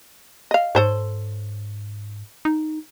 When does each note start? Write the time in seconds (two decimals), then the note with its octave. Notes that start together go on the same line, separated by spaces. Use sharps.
0.51 D#5 F5
0.75 G#2 A4 C5 C#5
2.45 D#4